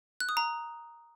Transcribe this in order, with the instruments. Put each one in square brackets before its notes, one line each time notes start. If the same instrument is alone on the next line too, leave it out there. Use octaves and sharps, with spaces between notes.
[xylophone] F#6
D#6
A#5